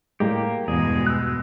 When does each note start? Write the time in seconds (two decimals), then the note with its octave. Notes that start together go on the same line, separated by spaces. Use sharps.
0.20 A2 G3 G#3 A#3 G4
0.68 E2 G2 B2 G#3 G#4
1.07 E6 F#6